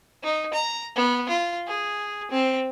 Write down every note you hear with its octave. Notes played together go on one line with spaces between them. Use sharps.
D#4
A#5
B3
F4
G#4
C4